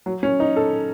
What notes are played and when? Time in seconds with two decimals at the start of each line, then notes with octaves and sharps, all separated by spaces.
0.06 F#3
0.23 C#4
0.40 D#4
0.56 A4